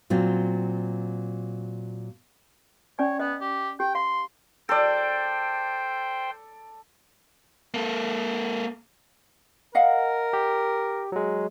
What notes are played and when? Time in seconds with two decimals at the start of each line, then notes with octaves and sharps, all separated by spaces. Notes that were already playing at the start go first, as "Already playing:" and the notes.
0.10 A#2 F#3 C4 F4
2.99 C#4 C#5 D5 G#5
3.20 B3 D#5
3.41 G4
3.80 G4 G5
3.95 F5 C6
4.69 A4 C5 D5 G5
7.74 A#3 A4
9.75 A#4 D#5 F5 F#5
10.33 G4
11.12 F#3 G#3